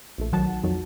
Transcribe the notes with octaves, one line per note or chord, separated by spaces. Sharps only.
A#1 A3
C2 D#3 F#3 F#5 A5
F2 D#3 F#3